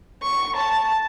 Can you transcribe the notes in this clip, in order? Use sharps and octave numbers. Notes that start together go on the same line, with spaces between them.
C#6
A5